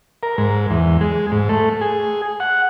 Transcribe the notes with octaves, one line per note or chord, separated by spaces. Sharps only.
A#4
G#2
E2
G#3
G#2
A3
G#4
F#5